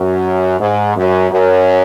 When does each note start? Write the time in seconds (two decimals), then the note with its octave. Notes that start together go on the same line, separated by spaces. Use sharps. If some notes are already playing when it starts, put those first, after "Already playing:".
Already playing: F#2
0.60 G#2
0.96 F#2
1.30 F#2